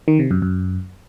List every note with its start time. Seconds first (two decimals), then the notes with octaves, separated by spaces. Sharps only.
0.08 D#3
0.19 C3
0.31 F#2
0.42 F#2